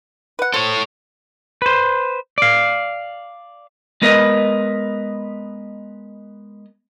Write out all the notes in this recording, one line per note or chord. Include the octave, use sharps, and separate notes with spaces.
B4 F#5
A4 C5 C#5
B4 C5
D5 F5
G#3 B3 A#4 B4 D#5